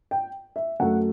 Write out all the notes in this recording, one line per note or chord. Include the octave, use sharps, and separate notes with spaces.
G5
E5
F#2 F#3 A3 F#5